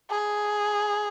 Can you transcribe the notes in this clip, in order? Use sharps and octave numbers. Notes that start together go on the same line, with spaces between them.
G#4